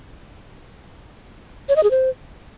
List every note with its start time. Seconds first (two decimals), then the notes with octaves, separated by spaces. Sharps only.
1.69 C#5
1.76 D#5
1.83 G#4
1.91 C5